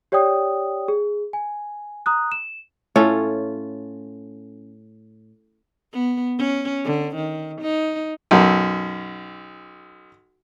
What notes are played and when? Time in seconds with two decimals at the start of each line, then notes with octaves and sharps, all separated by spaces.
0.12 G4 C#5 D5 G5 D#6
0.88 G#4
1.33 G#5
2.06 A#5 D#6 F#6
2.32 E7
2.96 A2 C#4 F4 A4
5.93 B3
6.38 C#4
6.84 D3
7.16 D#3
7.61 D#4
8.31 B1 F#2